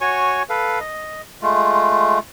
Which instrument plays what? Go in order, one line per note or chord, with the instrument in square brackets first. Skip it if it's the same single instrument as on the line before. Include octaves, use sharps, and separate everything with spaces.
[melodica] F#4 C#5 G#5 C#6
A4 B4 F5
D#5
G#3 A3 F4